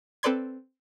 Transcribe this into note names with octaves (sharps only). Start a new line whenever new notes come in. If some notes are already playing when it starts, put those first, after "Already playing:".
C4 A4 B4 D5 C6 G#6